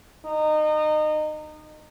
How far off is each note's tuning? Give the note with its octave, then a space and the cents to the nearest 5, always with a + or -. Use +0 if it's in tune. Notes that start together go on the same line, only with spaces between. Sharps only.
D#4 -25